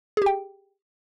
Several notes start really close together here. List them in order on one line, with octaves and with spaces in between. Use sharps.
G#4 G4 G5